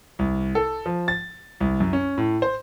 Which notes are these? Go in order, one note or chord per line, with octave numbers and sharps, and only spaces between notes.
C2
A4
F3
A6
C2
F#2
C#4
A2
C5